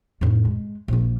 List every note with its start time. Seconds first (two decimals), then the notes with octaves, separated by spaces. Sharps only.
0.21 F2 A2
0.45 G#3
0.88 A#1 A#3